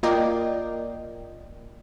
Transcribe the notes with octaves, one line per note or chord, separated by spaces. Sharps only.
A#3 F4 A#4 D5 D#5 G5